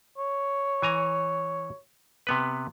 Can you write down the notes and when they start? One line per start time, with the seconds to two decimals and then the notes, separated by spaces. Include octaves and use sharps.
0.18 C#5
0.82 E3 G#5 A#5
2.27 C3 B3 B4